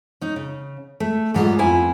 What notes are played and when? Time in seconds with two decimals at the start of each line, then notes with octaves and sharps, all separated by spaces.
0.21 C#4 D#4
0.36 C#3
1.00 A3
1.34 G#2 F#3 G3 F4 G#4 D#5
1.59 F2 B3 E4 F4 G#5 A#5